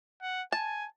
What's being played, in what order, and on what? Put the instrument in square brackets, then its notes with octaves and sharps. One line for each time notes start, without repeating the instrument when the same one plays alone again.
[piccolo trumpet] F#5
[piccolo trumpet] G#5 [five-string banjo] A5